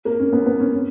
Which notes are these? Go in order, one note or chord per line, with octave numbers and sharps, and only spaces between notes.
A#3
C#4
B3
B3
C#4
C#4